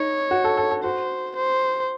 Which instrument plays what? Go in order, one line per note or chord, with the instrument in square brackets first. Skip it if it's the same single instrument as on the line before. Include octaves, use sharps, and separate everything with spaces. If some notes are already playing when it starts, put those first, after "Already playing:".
Already playing: [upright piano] D#4 [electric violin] C#5
[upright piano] F#4
A4
A4
A4
[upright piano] F#4 [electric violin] C5
[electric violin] C5